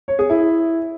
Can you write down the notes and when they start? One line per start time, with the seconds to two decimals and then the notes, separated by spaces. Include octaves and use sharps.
0.08 C#5
0.19 G#4
0.30 E4